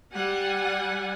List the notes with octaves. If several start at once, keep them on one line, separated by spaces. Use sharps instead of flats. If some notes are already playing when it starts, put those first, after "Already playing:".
G3 F#5 G#5